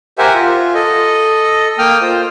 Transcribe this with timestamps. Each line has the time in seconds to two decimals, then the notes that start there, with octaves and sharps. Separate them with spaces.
0.18 G4 A#4 C5 E5 F#5 G#5
0.34 F4
0.74 A4 D#5
1.79 A#3 G5 D#6 F6
2.01 F4 C5